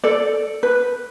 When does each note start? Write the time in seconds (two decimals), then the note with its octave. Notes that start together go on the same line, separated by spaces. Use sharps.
0.04 A4 D5
0.63 B4